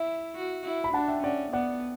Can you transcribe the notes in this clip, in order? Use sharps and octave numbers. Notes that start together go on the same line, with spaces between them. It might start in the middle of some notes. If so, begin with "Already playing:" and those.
Already playing: E4 E5
F#4
E4
B5
D4 F#5 A5
E5 G5
C#4 D5 F#5
B3 D5 F#5